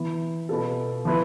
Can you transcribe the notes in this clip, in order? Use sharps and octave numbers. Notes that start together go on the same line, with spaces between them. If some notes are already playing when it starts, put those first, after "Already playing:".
Already playing: E3 B3 E4
B2 B3 F4 A4
F3 B3 E4 B4